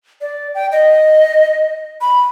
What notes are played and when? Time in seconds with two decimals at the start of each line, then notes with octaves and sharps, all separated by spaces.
0.21 D5
0.55 G5
0.72 D#5
2.01 B5